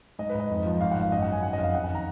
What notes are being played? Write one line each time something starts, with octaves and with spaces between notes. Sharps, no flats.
G#2 D#5
B4
G#2
D#5
F2
F3
G#1 F5
F#5
G#2 F5
F#2 D#5
F#5
F#2
G#5
D#3 F#5
D#5
F2
F5
F2 F#5
F#5
D#3 A#5